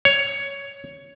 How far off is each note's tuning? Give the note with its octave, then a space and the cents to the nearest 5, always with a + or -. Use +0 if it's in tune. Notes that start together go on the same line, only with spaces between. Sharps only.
C#5 +10